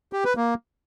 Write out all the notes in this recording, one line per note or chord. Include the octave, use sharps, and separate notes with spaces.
G4
B4
A#3